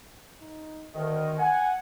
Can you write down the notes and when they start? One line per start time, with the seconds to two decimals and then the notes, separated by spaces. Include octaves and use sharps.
0.41 D#4
0.94 D2 D#3 D#5
1.38 F#5 G#5